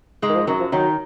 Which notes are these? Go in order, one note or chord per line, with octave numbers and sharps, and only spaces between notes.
G#2 G#3
D#3
F3
F#2 D#3 F#3
F3
D#3 F#3 D#4